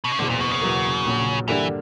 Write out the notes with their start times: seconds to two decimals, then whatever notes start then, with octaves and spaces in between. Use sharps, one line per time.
0.04 B2
0.12 C#3
0.19 F#1 E2 B2 D3
0.29 A#2
0.40 B2
0.51 C#3
0.61 E2 B2 F#3 A#3
1.05 A#1 A#2 F#3 C#4
1.48 G2 D3 E3 A#3 D4 G4